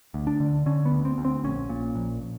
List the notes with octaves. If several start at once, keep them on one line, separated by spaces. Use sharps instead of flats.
D2
D4
D3
D3 C#4
B3
D2
C4
D2
C4
A#1 C#4
A#2
A#1